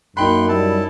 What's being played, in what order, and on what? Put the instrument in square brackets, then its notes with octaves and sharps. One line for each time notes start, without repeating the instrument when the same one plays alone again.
[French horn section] F#2 [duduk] A#3 [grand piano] D#4 G5 B5 [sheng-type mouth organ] C6 F#6
[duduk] G3 [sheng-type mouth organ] E4 A5